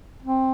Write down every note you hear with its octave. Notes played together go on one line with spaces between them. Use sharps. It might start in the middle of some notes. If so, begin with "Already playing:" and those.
C4